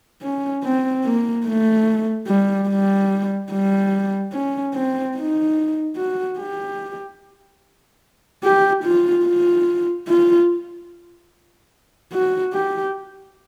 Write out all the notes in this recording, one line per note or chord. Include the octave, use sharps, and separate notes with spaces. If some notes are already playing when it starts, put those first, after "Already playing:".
C#4
C4
A#3
A3
G3
G3
G3
C#4
C4
D#4
F#4
G4
G4
F4
F4
F4
F#4
G4